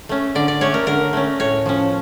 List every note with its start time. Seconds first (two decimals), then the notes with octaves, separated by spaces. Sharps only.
0.09 A3 C#4
0.35 D3 D5
0.48 D5
0.61 A3 C#4 C#5
0.74 A#4
0.87 D3 A#4
1.13 A3 C#4
1.40 A2 C#5
1.66 F3 C#4